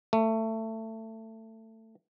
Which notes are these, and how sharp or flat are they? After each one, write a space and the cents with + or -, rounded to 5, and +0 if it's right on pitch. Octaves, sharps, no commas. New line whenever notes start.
A3 +20